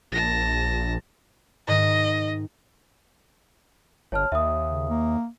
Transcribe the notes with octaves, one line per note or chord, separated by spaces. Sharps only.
A#1 A5 A#6
G#2 D#3 D#5
G1 C#5 A5 F6
D#2 E5 D#6
C#3
A#3